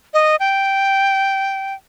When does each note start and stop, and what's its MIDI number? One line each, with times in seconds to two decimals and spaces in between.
0.14 0.36 75
0.40 1.74 79